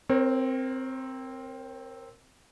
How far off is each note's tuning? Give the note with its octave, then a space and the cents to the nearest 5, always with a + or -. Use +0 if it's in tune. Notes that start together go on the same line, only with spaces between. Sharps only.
C4 +0 A#4 +0 C#5 -40